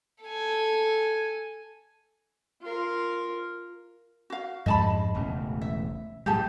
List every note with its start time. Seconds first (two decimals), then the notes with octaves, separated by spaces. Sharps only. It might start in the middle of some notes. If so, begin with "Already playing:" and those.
0.24 A4 G#5
2.62 F4 A#4
4.30 F#4 F5
4.66 F2 G#2 G#3 D#5 A5 B5
5.14 E1 A1 C#3
5.61 E5
6.26 A2 F#3 G3 G4 G#4 A5